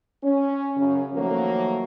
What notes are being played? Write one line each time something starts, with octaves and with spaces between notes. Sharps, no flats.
C#4
F#2 C#3 C#4
D#3 F3 F#3 A3 A#3